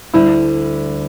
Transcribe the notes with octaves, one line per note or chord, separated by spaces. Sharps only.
D2 D3 G3 E4